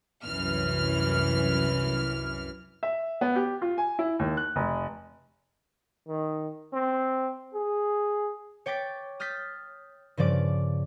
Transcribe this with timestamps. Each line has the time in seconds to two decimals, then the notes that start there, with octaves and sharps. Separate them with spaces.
0.23 C2 F#2 E3 F6
2.83 E5
3.21 B3
3.36 G4
3.62 F4
3.78 G#5
3.99 E4
4.19 D#2
4.37 F#6
4.56 F1
6.08 D#3
6.74 C4
7.54 G#4
8.66 C#5 G5 D6 A6 B6
9.20 D#6 F6 G6 A6 B6
10.17 G2 C#3 F3 D5 D6